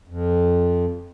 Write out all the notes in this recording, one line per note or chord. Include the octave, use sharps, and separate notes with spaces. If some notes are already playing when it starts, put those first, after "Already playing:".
F2